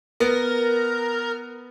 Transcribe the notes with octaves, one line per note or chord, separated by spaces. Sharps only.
B3 A#4